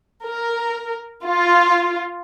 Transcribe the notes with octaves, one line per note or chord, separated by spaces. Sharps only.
A#4
F4